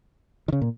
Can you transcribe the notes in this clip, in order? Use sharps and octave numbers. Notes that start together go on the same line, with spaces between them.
D#3
C#3
A#2